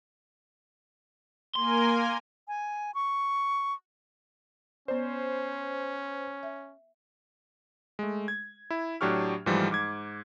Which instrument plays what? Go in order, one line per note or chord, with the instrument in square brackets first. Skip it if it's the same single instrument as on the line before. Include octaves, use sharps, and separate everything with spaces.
[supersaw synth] A#3 A#4 G#5 [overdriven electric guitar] C6
[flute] G#5
C#6
[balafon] B3 D5 [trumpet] C#4 [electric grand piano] C5
[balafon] E5
[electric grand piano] G#3 A3
G#6
E4
A2 F#3 D4 G4 C#6 F6
G#2 E3 F3 G3 A3
G#2 D6 G#6